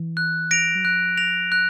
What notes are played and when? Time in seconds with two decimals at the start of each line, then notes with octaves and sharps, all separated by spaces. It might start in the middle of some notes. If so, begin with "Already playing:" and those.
Already playing: E3
0.17 F#6
0.51 A#6 D7 F7
0.75 F#3
0.84 F3 F#6
1.17 A#6 D7 F7
1.52 F#6